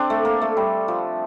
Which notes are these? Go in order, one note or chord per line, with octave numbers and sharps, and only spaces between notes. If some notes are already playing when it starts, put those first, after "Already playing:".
Already playing: C4 D4
A3
A#3
A3
G3
F3